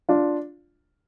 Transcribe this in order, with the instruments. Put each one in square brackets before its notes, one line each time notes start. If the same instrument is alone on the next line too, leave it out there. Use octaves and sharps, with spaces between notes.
[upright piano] D4 F4